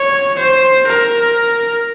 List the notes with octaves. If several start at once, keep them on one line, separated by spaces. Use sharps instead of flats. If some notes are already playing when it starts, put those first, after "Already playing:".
Already playing: C#5
C5
A#4